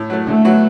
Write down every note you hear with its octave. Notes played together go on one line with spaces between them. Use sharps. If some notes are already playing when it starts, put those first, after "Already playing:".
Already playing: A2
F#3 A3
D3 A3
F#3 B3 F#4